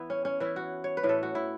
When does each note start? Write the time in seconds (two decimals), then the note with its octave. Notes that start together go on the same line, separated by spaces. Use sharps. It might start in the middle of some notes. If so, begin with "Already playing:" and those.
Already playing: E3 B3 E4
0.10 C#4
0.25 C#4
0.40 E3 C#4 E4
0.56 F#4
0.84 C#5
0.97 B4
1.03 A2 E3 C#4
1.09 A4
1.23 F#4
1.35 E4